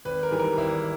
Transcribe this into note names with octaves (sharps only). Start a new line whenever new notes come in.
G#1 B4
A#4
G#2 E3 G3
A#4
G#1 E4